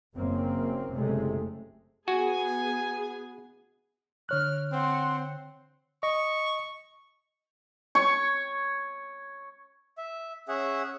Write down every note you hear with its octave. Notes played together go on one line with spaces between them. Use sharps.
F#1 F#2 A#3 C4
F#1 C3 G#3 A3
B3 F#4 G#4 G#5
D3 C#5 F6 F#6
C4 F#5 C6
D#5 C#6
C#5 C#6
E5
C#4 G#4 E5 F#5